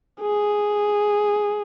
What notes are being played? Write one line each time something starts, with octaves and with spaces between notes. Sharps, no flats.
G#4